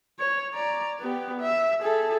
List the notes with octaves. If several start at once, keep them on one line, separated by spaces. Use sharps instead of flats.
C#5
D5 A#5
B3 G4
E5
G#4 A4